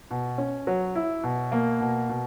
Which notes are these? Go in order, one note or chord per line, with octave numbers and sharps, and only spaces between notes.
B2
C#4
F#3
E4
B2
A#3
B2
B2